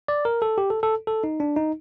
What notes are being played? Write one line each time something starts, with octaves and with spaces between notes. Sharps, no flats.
D5
A#4
A4
G4
A4
A4
A4
D#4
D4
D#4